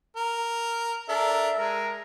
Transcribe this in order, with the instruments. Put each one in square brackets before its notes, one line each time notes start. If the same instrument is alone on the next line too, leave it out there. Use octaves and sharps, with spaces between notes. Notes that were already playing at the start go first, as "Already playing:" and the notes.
[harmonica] A#4
[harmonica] D4 A4 A#4 [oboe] E5
[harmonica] G#3 [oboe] A#4